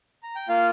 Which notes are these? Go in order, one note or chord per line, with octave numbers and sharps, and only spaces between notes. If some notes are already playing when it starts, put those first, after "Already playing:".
A#5
G5
A#3 F4 F5